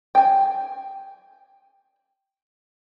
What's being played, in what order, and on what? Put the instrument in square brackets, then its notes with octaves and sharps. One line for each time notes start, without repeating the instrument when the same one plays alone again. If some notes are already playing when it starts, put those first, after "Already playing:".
[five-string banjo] G5 G#5